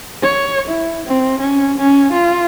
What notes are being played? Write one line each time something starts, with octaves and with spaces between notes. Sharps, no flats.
C#5
E4
C4
C#4
C#4
F4